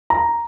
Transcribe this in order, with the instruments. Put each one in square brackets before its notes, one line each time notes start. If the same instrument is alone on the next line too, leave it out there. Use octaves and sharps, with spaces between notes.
[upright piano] A#5